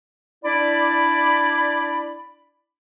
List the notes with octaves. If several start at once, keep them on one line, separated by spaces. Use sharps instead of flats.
D4 E4 D5 B5